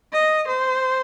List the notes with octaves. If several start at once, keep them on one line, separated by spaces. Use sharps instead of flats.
D#5
C5